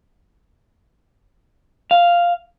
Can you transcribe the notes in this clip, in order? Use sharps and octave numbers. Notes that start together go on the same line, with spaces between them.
F5